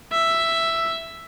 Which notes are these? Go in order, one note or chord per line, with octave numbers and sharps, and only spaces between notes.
E5